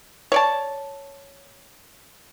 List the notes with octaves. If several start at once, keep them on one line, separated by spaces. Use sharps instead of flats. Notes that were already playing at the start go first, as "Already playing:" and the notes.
C#5 D5 A5